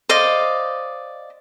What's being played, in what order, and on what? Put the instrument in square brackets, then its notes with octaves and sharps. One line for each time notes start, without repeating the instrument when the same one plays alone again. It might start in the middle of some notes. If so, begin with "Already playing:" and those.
[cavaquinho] C5 D5 D#5 F5